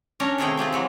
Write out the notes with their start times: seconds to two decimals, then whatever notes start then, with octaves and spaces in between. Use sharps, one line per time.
0.20 C#4 D4 A#4
0.38 C3 D#3 A3 G#4 F5 G5
0.57 C4 F4 G4 G#4
0.72 E3 F#3 G#3